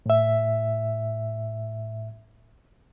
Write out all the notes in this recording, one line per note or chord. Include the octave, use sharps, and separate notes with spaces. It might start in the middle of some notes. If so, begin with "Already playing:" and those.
A2 E5